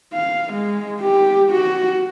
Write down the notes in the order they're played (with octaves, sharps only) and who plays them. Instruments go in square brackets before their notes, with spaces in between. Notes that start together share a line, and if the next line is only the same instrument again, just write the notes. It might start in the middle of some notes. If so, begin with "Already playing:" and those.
[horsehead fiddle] F5
G#3
G4
F#4